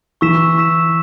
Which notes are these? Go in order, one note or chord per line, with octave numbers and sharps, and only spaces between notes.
E3 C#6 E6 B6 E7
C#6 E6 B6 E7